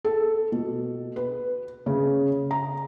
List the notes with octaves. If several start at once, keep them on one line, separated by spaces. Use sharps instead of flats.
A4
B2
B4
C#3
A#5